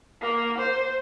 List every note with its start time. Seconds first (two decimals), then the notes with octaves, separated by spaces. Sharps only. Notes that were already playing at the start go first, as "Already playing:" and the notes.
0.22 A#3
0.59 C5